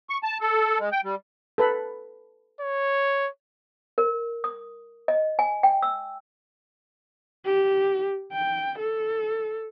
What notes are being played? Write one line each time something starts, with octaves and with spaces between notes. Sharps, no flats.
C#6
A5
A4
G#3
G5
G3
A4 B4 B5
C#5
A#4
D#6
D#5
G#5
G5
E6
G4
G5
A4